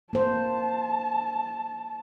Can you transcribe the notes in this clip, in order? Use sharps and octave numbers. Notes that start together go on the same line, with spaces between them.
A#3 C5 A5